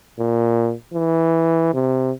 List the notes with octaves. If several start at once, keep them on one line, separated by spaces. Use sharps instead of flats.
A#2
E3
C3